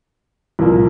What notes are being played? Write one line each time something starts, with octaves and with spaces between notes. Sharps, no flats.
C2 A#2 F3 A#3